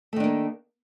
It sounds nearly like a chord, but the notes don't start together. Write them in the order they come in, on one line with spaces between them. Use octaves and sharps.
A3 D#3 D4 A#3